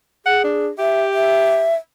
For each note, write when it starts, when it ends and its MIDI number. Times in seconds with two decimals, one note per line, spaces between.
0.26 0.68 68
0.26 0.42 78
0.44 0.70 62
0.79 1.70 67
0.79 1.03 76
1.14 1.75 76